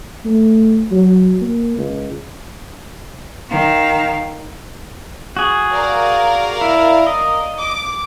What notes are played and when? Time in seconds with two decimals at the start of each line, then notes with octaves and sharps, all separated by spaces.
0.25 A3
0.91 F#3
1.41 A#3
1.77 C#2
3.49 D#3 F5
5.37 F#4 G#4
5.72 A#4 D5 F5
6.61 E4
7.07 D#5
7.57 D6